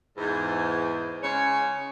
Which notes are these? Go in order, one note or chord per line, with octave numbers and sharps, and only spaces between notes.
E2 G#2
C#3 G#3 C#5